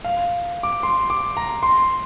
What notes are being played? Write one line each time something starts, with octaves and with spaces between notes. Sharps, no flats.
F5
D6
C6
D6
A#5
C6